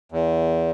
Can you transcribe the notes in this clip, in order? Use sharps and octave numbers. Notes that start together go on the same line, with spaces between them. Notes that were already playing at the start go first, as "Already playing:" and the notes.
E2